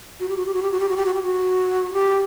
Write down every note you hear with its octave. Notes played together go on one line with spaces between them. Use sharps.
F#4
G4
F#4
G4
F#4
G4
F#4
G4
F#4
G4
F#4
G4
F#4
G4